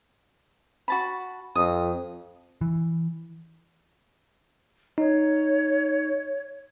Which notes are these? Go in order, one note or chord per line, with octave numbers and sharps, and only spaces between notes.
F#4 A5 B5
F2 D#6
E3
D#4 C#5